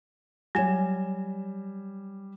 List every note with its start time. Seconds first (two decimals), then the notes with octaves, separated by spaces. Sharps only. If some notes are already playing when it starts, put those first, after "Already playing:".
0.55 F#3 G3 C#5 G#5 G#6 E7